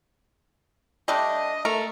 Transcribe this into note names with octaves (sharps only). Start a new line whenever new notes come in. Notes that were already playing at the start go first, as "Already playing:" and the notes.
G3 A3 D4 D#5
A3 A#4